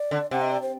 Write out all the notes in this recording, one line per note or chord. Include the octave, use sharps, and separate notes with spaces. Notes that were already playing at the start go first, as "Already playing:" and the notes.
Already playing: D5
D3
C3 F#5
D#5
D5
C5